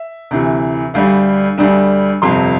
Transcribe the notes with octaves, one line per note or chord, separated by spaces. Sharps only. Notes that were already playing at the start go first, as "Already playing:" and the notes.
Already playing: E5
D2 C3 E3
D2 D3 G3 D4 F5
D2 D3 G3 D4
G1 F2 C3 C6